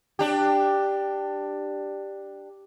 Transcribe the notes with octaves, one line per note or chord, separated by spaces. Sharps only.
D4 G4